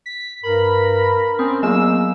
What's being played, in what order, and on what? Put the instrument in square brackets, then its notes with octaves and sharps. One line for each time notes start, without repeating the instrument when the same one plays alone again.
[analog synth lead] B6
[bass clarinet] G2 [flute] A#4 [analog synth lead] B5
[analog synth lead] C4 [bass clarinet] C#4 [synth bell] B5 D#6
[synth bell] F#3 B3 G#4 [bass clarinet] A#3 [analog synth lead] E6